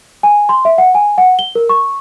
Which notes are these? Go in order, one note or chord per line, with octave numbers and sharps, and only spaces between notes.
G#5
C6
E5
F#5
G#5
F#5
G7
A#4
C#6